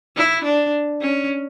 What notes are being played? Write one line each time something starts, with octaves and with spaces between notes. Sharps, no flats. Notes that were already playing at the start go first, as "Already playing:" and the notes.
E4
D4
C#4